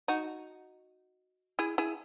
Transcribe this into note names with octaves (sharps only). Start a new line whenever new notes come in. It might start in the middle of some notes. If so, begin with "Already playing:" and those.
D#4 F#4
E4 G#4
E4 G#4